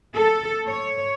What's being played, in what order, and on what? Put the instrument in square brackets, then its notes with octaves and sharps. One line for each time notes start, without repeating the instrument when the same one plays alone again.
[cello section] A4
C#5